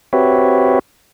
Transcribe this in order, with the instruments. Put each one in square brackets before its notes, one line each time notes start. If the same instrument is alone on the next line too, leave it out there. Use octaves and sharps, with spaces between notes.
[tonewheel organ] C4 F#4 G4 B4 C#5 E5